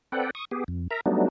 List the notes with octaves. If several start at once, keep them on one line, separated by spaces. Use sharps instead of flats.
C4 A4 B4 D5 F#5 G5
C#6 D#6
B3 G4 G#4
F2
A#4 E5 A#5
F#3 G3 A3 B3 D4 D#4